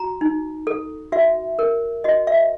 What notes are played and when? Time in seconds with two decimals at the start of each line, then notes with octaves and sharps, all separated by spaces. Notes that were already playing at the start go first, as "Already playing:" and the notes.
Already playing: F#4 A#5
0.21 D#4
0.67 A4
1.12 F#4 E5
1.59 A#4
2.04 F#4 D#5
2.27 E5